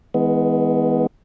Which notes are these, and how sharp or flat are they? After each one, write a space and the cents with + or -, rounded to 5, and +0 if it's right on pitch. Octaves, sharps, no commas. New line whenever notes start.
E3 -35 G#3 +0 B3 +10